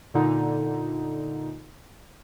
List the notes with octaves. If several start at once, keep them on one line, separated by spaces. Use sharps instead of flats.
A#2 D3 D#4